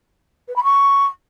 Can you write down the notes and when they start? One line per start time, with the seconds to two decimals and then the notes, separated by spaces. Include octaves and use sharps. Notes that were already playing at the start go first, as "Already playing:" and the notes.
0.48 B4
0.56 B5
0.64 C#6